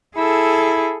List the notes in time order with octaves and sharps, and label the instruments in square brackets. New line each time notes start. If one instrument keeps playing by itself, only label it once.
[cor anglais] E4 [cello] G#4 A4